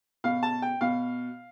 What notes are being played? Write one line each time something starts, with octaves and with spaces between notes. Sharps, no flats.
B2 F5
A5
G5
B2 F5